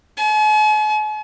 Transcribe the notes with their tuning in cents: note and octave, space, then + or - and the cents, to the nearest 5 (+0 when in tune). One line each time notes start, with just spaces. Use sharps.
G#5 +45